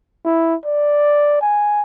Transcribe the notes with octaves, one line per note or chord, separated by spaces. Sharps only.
E4
D5
G#5